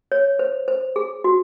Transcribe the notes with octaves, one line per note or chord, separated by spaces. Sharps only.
C#5
C5
C5
G#4
F#4